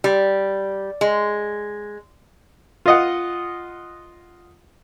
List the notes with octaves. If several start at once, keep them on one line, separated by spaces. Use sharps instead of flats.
G3
G#3
F4 D#5 F#5